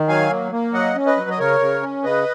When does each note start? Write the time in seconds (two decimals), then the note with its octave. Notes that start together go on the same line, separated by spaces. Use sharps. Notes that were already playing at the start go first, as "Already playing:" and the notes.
Already playing: D#3
0.08 F#3 F5 G#5
0.30 A#3
0.52 A#3
0.73 F#3 D#5 F#5
0.96 C#4
1.06 B4 D#5
1.17 F#3
1.30 D#5
1.39 C#3 A#4 C#5
1.60 C#3
1.82 C#4
2.04 C#3 B4 D#5